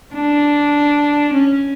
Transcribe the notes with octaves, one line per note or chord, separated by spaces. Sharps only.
D4
C#4